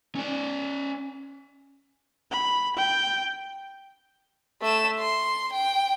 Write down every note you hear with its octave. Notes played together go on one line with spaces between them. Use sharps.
C#4 D5
B5
G5
A3 E7
C6
G5